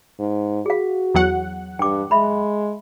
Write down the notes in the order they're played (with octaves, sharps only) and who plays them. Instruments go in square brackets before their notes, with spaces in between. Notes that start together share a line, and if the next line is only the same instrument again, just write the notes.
[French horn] G#2
[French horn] F#4 [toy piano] G#4 F5
[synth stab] E2 F#3 F#5
[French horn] G2 [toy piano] G5 D6
[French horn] G#3 [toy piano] E5 B5